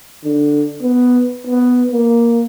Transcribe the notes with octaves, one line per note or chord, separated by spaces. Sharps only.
D3
B3
B3
A#3